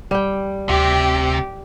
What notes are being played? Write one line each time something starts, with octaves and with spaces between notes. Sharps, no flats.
G3 G5
D2 C3 G4